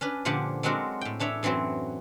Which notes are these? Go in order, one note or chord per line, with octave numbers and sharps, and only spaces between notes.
C#4 D4 B4
A#2 D3 F3 G4 F#5 G#5
F#3 G#3 C4 D4 F#4 A#4
A2 G5
E3 D4 C#5 E5
F#2 E3 F#3 C4 F#4